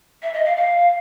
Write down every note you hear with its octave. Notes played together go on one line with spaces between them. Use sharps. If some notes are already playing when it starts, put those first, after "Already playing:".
E5
D#5
F5
F5